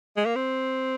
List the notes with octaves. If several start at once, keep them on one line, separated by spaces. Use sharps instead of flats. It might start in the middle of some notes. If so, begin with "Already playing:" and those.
G#3
A#3
C4